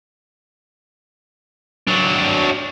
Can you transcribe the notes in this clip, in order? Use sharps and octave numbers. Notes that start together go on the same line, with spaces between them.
F#3 D4